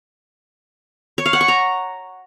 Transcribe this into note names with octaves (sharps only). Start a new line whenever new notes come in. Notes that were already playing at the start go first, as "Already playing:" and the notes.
C#5
F5
F#5
C#6
A#5